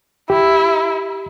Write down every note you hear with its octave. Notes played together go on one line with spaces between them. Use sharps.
E4 G4